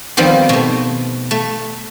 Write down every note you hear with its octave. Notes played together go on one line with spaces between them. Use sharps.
D#3 F3 G3 B3 C4
B2 A3
A3